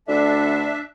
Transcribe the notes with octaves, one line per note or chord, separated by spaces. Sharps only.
D2 D4 A4 D5 E5